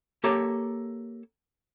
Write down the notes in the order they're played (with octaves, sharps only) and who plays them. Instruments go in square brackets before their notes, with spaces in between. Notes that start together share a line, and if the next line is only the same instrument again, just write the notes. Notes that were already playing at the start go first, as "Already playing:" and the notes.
[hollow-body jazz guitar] A#3 G4 A4 C#5 A#5